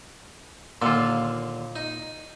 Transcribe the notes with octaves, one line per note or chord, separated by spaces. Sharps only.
D#2 A#2 D3 F4 A4
D#4